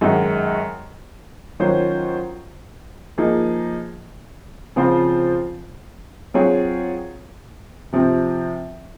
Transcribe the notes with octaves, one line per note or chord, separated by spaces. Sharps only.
F#2 D#3 G#3 D#4 F#4
D#3 F#3 C#4 F4 C5
F3 A#3 D#4 G#4
C#3 F3 C4 F4 C5
F#3 C4 F4 G#4 C#5
C3 F3 C4